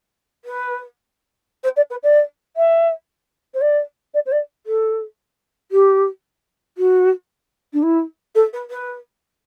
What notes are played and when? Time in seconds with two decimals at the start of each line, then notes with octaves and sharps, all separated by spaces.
0.45 B4
1.63 C5
1.76 D5
1.90 B4
2.03 D5
2.56 E5
3.54 C5
3.61 D5
4.14 D5
4.26 C5
4.32 D5
4.66 A4
5.71 G4
6.77 F#4
7.73 D4
7.83 E4
8.35 A4
8.53 B4
8.70 B4